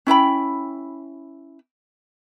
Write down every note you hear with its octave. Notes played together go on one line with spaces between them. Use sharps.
C#4 E4 G5 B5